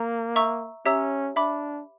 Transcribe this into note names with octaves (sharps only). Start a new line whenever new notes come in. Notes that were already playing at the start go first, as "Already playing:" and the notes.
Already playing: A#3 A#5
E5 A#5 C#6 E6
C#4 G4 C#5 E5 A#5 E6
D4 E5 B5 D6